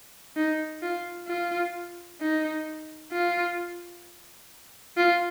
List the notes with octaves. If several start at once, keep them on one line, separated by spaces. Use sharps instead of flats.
D#4
F4
F4
D#4
F4
F4